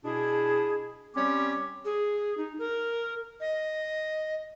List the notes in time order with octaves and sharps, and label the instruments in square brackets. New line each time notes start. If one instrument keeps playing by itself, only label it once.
[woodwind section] B2 D4 E4 G#4
G3 C4 C#4 G4 C#5 D6
[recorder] G#4
D#4
A#4
D#5